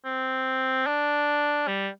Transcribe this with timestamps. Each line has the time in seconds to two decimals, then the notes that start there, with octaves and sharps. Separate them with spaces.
0.05 C4
0.87 D4
1.68 G3